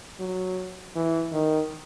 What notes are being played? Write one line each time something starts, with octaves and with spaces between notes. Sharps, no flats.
F#3
E3
D#3